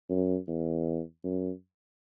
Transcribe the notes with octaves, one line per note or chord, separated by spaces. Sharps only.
F#2
E2
F#2